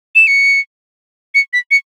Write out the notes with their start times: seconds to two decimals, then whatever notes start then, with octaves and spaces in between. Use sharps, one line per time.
0.15 E7
0.27 C#7
1.35 C#7
1.53 B6
1.71 C#7